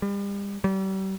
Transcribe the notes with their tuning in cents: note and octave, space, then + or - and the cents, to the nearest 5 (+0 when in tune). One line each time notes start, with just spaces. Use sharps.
G3 +35
G3 -35